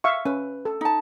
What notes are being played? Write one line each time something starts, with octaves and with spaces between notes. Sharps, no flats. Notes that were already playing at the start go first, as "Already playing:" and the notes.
E5 F5 C#6
C#4 B4
A4
D#4 A5